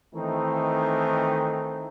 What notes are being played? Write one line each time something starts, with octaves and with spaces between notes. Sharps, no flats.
D#3 E3 A3 C4 D#4